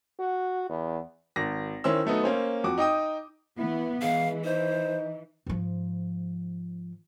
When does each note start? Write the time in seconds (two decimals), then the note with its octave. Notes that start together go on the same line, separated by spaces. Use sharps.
0.19 F#4
0.69 E2
1.36 G#1 A#6
1.84 D#3 C#4 E4 C5 E6
2.05 F#3 A3 B3 D#4
2.23 A#3 C#4 C5
2.64 F2 F#4 D6
2.78 D#4 D#5 G5 D#6
3.59 E3 B3 E4
4.02 E3 G#3 F5
4.45 D#4 C5
5.46 G#2 F3